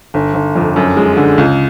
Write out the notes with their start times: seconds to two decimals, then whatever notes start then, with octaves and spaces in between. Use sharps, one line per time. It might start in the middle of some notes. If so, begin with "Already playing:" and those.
0.14 G1
0.34 G1
0.56 F2
0.76 F#2
0.97 G#3
1.17 D3
1.38 C#2